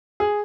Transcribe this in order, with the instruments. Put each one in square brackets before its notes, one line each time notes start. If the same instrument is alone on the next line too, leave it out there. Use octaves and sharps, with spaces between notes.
[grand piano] G#4